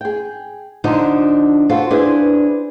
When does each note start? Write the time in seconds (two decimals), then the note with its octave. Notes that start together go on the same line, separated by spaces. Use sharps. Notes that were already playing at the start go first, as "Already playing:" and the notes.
0.01 G#4 G5
0.84 D3 F3 D4 D#4
1.69 F4 F#4 A4 C5
1.91 D4 E4 G#4 B4 C5